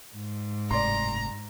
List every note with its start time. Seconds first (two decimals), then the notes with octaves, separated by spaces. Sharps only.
0.14 G#2
0.71 F#1 A2 C3 D5 A#5 C6